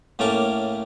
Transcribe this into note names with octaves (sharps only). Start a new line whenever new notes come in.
A2 A3 A#3 C#4 A5 D6